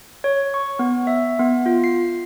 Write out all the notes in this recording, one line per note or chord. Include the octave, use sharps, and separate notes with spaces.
C#5
C#6
B3
E5
B3
F4
C7